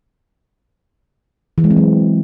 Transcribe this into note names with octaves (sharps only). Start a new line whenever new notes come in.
E3
G#3
C4
F#3